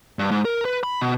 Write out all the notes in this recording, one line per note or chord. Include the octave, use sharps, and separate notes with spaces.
G2
G#2
A#4
B4
B5
B2